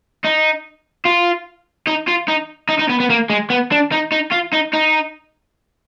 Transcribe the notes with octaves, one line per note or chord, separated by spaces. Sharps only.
D#4
F4
D#4
F4
D#4
D#4
D#4
B3
B3
A#3
G#3
B3
D4
D#4
D#4
F4
D#4
D#4